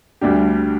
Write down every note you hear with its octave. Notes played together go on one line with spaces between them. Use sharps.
D2 D3 G3 D4 G4